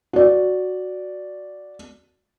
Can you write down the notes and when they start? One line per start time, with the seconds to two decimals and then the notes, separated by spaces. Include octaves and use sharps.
0.13 F#4 D5